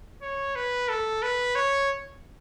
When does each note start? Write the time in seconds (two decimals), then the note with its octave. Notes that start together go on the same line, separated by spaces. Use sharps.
0.22 C#5
0.56 B4
0.89 A4
1.23 B4
1.56 C#5